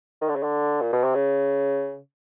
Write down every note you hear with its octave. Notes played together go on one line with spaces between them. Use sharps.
D#3
D3
C#3
D3
A#2
B2
C3
C#3